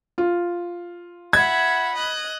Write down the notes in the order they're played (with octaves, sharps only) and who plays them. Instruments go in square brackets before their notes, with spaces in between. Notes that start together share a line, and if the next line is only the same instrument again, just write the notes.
[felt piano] F4
[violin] E5 F#5 [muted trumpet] B5 [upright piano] G#6
[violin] D#5 F#6